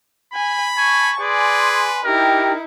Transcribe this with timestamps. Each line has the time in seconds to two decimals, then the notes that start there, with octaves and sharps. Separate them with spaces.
0.34 G#5 B5
0.77 G#5 A5 C#6
1.20 G#4 B4 D5 G#5 C6
2.04 D#4 E4 G4 A#4 G5